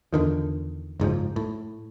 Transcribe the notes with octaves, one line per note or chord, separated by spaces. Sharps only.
E2 D3 D#3 F3
F#1 G#2 C#3 F3
A2